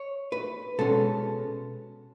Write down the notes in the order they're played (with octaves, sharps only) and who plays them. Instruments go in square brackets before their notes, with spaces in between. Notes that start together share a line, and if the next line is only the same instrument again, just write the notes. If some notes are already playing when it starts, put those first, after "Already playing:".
Already playing: [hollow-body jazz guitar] C#5
B4
B2 G#3 C#4 A4